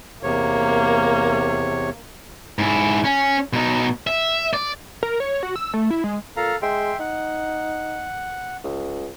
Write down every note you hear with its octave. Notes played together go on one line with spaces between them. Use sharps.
E2 C3 A#3 C#5
G#2 E4
C#4
B2 D#4
E5
D5
A#4
C#5
F#4
E6
A3
E4
G#3
A#2 A4 F5 A#5
G#3 E5 G5 C6
D#4 F#5
C#2